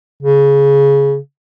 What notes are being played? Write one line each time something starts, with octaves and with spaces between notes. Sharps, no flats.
C#3